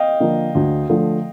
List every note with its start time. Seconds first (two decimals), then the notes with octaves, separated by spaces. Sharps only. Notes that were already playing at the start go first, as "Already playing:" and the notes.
Already playing: D#5 F5 G5
0.20 D3 F3 A#3
0.55 D2
0.89 D3 F3 A3